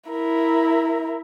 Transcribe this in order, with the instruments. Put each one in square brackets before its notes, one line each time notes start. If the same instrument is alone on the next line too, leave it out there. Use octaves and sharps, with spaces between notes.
[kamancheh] E4 A#4